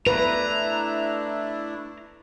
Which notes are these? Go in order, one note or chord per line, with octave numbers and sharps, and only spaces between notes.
A3 D4 E4 B4 A#5